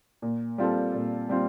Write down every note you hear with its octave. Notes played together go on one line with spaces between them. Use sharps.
A#2
G3 C4 F4 A4
A#2
G3 C4 F4